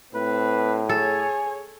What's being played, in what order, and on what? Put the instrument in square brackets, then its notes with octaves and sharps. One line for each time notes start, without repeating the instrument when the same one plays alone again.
[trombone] A2 [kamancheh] C4 [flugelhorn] B4
[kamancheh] G#4 C#5 [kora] A4 [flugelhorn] G#5